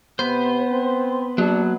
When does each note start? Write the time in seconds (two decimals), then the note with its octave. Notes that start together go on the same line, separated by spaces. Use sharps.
0.19 C3 B3 B4 C5
0.71 C4
1.38 F#3 A#3 D4